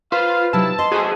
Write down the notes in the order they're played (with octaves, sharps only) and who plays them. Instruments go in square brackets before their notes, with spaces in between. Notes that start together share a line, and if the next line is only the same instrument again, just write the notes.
[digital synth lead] F4 [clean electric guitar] B4 C5 [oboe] F5
[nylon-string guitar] C3 F#3 D#4 [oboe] E4 [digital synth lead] A5
[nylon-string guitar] D#5 [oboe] C6
[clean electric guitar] F#4 A4 C5 [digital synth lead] G#4